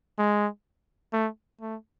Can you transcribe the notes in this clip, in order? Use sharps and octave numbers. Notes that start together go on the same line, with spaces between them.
G#3
A3
A3